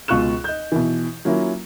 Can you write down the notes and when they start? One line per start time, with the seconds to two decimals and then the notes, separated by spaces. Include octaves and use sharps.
0.08 C#2 B2 F4 C#6 F#6 E7
0.44 D#5 G6
0.72 B2 E3
1.25 F#3 A#3 C#4 E4 F4